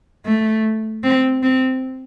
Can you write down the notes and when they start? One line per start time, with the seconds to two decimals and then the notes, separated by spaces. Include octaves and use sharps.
0.26 A3
1.04 C4
1.43 C4